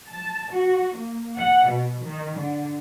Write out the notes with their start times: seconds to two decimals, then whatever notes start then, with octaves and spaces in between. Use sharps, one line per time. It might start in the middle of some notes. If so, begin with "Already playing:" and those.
0.11 A5
0.53 F#4
0.95 A#3
1.39 F#5
1.69 B2
2.05 D#3
2.38 D3